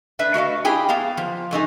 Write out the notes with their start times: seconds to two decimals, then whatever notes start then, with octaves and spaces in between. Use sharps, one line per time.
0.19 A3 D4 B4 E5
0.34 A3 F#4 D#5 F5
0.65 E4 G4 G#4 G5
0.89 B3 F5 A#5
1.17 F3
1.51 G#2 A3 D#4 G#4